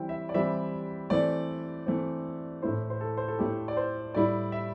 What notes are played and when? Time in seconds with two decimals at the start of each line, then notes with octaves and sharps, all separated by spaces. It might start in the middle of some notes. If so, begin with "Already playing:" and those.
Already playing: E3 G3 C4 E4 G5
0.09 E5
0.29 D5
0.34 E3 G3 C4 E4 E5
1.10 E3 A3 C4 D5
1.87 E3 A3 C4
2.62 A2 A3 E4 C5
2.90 C5
3.01 A4
3.17 C5
3.28 A4
3.38 A2 A3 E4 G4
3.68 D5
3.77 C5
4.14 A2 G3 E4 D5
4.52 E5